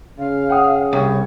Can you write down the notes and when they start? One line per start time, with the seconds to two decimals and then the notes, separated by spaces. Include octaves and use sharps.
0.18 C#3 F5
0.49 F#5 G5 D#6
0.93 C2 C#5